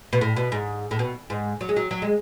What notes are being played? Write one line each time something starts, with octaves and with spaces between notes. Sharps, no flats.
B2
A2
B2
G#2
A2
B2
G#2
F#3
G#3
F#3
F#3
G#3